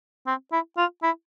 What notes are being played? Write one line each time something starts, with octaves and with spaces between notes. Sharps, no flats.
C4
E4
F4
E4